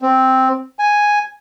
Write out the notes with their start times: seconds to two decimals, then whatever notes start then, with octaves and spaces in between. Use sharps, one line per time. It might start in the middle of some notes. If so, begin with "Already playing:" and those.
0.02 C4
0.79 G#5